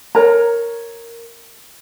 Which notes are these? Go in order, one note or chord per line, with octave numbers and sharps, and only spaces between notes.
A#4 C#5 A#5